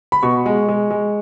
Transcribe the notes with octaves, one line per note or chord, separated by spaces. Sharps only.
B5
B2 C#6
G#3
G#3
G#3